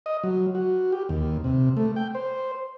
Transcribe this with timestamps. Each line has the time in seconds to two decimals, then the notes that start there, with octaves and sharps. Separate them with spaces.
0.06 D#5
0.24 F#3
0.55 F#4
0.92 G4
1.09 D#2
1.44 C3
1.77 A3
1.96 G5
2.15 C5